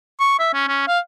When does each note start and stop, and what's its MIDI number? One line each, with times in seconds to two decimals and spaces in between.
0.20 0.35 85
0.39 0.51 76
0.53 0.67 61
0.68 0.87 61
0.88 0.99 77